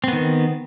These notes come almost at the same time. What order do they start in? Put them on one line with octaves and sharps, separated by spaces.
C4 B3 D#3